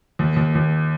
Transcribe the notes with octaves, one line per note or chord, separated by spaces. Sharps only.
D#2
D#2
D#2